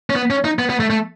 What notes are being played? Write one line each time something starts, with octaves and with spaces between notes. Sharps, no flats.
C#4
B3
C#4
D#4
B3
B3
A3
A3